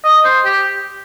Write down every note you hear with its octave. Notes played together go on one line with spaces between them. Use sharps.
D#5
C5
G4